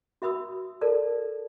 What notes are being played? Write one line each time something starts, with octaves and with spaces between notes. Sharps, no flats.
F#4 E5 B5 D#6 E6
A4 A#4 D5 A5